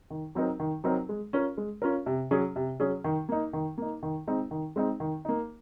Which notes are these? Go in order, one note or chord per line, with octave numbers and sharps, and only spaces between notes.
D#3
F#3 C4 D#4 A#4
D#3
F#3 C4 D#4 A#4
G#3
C#4 F4 A#4
G#3
C#4 F4 A#4
C3
F#3 C#4 G#4
C3
F#3 C#4 G#4
D#3
A#3 D#4
D#3
A#3 D#4
D#3
G#3 C4 D#4
D#3
G#3 C4 D#4
D#3
A#3 D#4